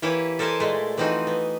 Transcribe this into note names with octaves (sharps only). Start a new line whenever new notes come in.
E3 A#3 E4 G4 C#5
A4 A#4 C5 D5 G#5 A5
A#2 G#3 A3
E3 F3 C4 D#4 F#4
B3